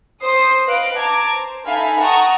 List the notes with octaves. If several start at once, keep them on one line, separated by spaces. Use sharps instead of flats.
C5 D#6 C7
B4 D#5 F5 F#6 D7
A5 A#5 D6 G#6
C5
D#4 A4 E5 F5 G#5 B5
F#5 G5 A5 A#5 C#6 D#6